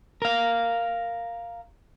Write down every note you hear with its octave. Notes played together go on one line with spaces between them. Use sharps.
A#4 F5